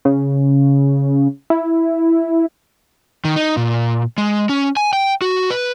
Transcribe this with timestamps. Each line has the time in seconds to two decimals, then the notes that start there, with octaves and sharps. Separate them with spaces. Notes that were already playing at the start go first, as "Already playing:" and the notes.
0.05 C#3
1.50 E4
3.25 D#3
3.36 D#4
3.57 A#2
4.18 G#3
4.49 C#4
4.77 G#5
4.93 G5
5.22 F#4
5.50 B4